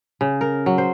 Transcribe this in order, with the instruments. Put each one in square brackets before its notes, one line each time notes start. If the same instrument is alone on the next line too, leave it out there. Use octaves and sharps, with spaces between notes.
[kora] C#3
A#4
F#3
C5